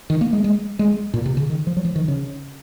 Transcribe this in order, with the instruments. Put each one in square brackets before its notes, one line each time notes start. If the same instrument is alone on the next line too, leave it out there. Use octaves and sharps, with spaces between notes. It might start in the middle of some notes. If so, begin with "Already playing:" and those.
[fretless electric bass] D#3
A#3
G#3
G#3
G#3
A#2
C3
C#3
D#3
F3
F#3
F3
D#3
C#3